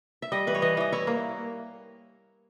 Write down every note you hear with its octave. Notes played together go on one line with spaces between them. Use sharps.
E5
G3 D#5
E3 B4
C#5
E3 D#5
E3 D#5
E4 C#5
A#3